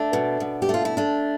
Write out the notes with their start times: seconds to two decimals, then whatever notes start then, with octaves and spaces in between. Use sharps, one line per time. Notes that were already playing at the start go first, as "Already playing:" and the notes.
Already playing: A3 D4
0.13 B2
0.40 B2
0.62 G4
0.69 A3 F4
0.85 E4
0.97 A3 D4